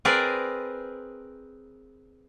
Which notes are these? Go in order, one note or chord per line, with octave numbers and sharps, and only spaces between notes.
C4 G#4 A#4 B4 D5